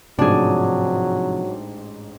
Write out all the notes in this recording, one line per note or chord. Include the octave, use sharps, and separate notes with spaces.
A1 G#2 C3 F3 F#3 D4 G#4